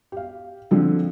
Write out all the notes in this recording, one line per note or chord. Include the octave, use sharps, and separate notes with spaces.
G4 F5
D3 F3 C4